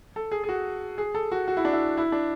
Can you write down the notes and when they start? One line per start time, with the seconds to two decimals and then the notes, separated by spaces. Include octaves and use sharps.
0.16 A4
0.32 G#4
0.44 G#4
0.49 F#4
0.98 G#4
1.15 A4
1.32 F#4
1.48 F#4
1.57 E4
1.65 D4
1.73 E4
1.97 E4
2.12 D4